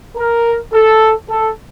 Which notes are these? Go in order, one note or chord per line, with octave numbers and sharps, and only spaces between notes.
A#4
A4
A4